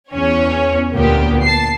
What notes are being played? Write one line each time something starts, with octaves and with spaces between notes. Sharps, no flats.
E2 C#4 C#5
D2 A#2 A#3 B3 G4
A5 C7